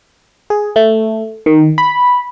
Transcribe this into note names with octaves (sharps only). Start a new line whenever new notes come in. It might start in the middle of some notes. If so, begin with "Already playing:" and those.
G#4
A3
D#3
B5